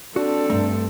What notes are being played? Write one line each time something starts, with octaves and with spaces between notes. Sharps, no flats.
C4 D4 F#4 A4
G2 A3 A#5